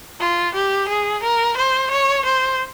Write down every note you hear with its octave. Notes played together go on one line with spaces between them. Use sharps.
F4
G4
G#4
A#4
C5
C#5
C5